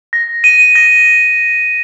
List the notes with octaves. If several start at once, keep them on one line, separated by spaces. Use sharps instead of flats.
A#6
D#7
A#6